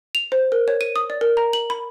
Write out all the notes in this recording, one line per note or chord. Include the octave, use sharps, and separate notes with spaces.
F7
C5
A#4
C#5
D#7
D#6
D5
A#4
A#5
F#7
B5